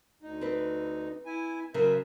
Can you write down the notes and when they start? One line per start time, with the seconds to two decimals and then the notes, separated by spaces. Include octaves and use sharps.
0.23 D2 D#4
0.41 C4 B4
1.26 E4 G#5
1.74 C#3 F#3 A#4 C5 E5